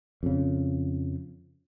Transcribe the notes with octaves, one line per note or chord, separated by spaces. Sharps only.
F2 C#3